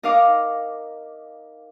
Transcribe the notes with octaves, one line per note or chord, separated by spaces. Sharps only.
D#4 A#4 F5 D6